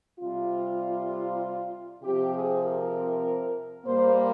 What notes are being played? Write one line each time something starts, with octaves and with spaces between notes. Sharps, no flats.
C3 G3 C4 F4
C3 F3 C4 G4
G#4
A#4
A#2 G3 A#3 C5